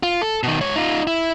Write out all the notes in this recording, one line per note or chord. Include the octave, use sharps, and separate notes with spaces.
F4
A4
B2 D#3
G#2 C#5
D#4 F4
E4